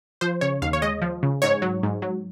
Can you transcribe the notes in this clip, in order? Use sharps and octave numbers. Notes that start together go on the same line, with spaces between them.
F3 C5
C#3 C#5
D#2 F5
C#5
G#3 D#5
F3
C#3
G#2 C#5
F#3
G#2
F#3